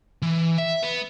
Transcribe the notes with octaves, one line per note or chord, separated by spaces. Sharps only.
E3
E5
B3